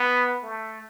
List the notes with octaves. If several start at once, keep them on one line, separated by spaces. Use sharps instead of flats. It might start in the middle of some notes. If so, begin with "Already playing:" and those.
Already playing: B3
A3